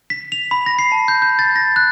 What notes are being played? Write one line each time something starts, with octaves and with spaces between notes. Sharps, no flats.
B6
F7
B5
A#6
C7
A5
G6
G6
A6
A#6
F#6